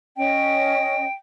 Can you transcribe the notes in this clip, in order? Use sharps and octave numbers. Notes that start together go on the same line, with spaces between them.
C#4 D#5 G5